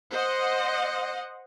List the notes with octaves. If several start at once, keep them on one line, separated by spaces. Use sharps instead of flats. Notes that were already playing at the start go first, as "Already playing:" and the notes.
C5 D#5 F#5